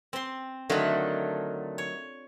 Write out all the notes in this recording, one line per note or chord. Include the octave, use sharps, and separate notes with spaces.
C4 C6
D3 D#3 F#3 A3 F4
C#5